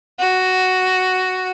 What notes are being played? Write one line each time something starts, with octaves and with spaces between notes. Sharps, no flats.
F#4